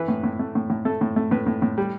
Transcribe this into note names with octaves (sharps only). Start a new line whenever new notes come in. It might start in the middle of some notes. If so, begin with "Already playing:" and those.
Already playing: E3 B4
A2
A2
A3
A2
A2
A3 A4
A2
A3
A2 B4
A2
A2
G3